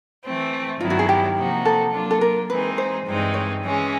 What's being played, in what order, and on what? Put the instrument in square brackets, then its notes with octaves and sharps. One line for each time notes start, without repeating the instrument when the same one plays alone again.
[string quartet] E3 A3 C4
[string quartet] G2 D#3 F#3 B3 E4 [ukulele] F4
[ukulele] F#4
G#4
G4
[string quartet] C3 F3 A#3 D#4 F#4
[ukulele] A4
[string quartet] F#3 A#3 D4 F4
[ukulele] A4
A#4
[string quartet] E3 G#3 C4 D#4 G#4 [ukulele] B4
[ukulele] C5
[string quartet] G2 E3 G#3 C4 D#4
[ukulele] C#5
[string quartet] E3 G#3 C#4